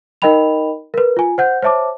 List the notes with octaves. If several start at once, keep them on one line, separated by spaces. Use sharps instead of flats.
D#4 A#4 D#5 G5 B5 F7
A#4 B4
F4 G#5
C5 F#5 G6
C5 C#5 E5 A5 D6